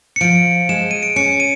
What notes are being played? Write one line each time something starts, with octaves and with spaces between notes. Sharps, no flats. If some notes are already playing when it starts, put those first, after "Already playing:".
C#7
F3 D7
G#3 E7
D#7
D7
C#4 C#7
D#7